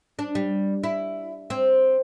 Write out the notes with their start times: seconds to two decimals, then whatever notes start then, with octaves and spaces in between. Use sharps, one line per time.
0.19 D4
0.35 G3
0.83 E4
1.50 C4